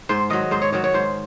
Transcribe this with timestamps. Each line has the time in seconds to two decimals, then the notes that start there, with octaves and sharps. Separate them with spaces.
0.09 G#2 C5
0.30 D#3 F#3 D#5
0.51 G#2 C5
0.62 C#5
0.72 D#3 F#3 C#5
0.84 C#5
0.93 G#2 C5